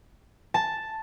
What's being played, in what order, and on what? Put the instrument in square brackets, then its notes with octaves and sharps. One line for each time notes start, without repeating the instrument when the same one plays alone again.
[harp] A5